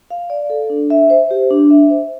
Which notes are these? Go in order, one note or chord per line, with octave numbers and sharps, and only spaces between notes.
F5
D5
A4
D4
E5
C5
G4
D4
E5
C5